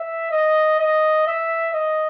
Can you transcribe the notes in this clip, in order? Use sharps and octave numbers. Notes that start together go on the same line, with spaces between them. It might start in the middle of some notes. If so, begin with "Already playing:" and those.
Already playing: E5
D#5
D#5
E5
D#5